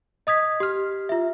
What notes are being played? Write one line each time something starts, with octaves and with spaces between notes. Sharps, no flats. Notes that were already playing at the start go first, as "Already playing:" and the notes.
D#5 D#6 G#6 B6
G4 F6
F4 E5